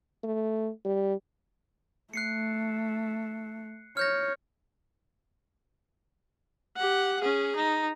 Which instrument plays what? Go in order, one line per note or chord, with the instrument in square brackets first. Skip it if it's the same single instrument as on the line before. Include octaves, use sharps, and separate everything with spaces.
[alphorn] A3
G3
[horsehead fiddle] A3 [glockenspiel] F#6 C7 C#7
[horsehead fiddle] C#5 [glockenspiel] F6 G6 A#6
[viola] G4 F#5
C#4 G#4
D#4